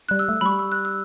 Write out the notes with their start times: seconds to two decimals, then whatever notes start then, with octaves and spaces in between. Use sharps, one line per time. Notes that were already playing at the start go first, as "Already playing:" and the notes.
0.09 G3 F#6
0.19 E6
0.29 A3
0.41 F#3 B5
0.46 G3 C#6
0.59 E6
0.72 F#6
0.85 E6